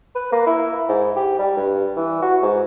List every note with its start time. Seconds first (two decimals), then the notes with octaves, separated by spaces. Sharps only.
0.15 B4
0.32 A#3
0.47 E4
0.89 G#2
1.16 G4
1.39 G3
1.57 G2
1.96 E3
2.22 F#4
2.42 G#2